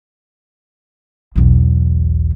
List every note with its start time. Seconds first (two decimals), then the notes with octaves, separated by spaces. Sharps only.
1.36 B1 E2